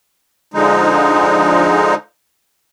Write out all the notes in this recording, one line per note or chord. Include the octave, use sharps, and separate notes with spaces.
D3 F3 G#3 D#4